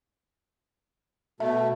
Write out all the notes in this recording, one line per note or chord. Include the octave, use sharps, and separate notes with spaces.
B2 A3 E5